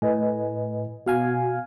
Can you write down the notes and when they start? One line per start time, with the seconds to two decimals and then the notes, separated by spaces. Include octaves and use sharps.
0.02 A2 B4 D#5 G#5
1.06 B2 F#4 F5 G#5